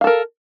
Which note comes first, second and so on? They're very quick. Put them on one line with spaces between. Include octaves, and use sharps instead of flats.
F5 A4 A#4